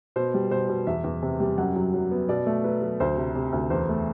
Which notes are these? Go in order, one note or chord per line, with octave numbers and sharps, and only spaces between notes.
B2 C5
G3
B2 C5
B2
E2 E5
E2
C3
G3
F#2 F#5
F#3
F#3
B3
B2 D5
A3
F#3 B4
F#3
D2 C5
C3
C3
D2
E2 C5
A3